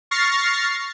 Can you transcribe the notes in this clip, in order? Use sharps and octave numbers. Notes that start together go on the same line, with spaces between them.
C#6 F6 A6 A#6 C7